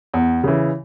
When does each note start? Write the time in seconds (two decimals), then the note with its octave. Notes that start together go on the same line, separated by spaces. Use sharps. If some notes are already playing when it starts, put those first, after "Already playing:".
0.14 E2
0.44 C#3 E3